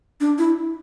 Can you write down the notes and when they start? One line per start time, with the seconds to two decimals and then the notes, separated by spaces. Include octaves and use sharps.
0.20 D4
0.38 E4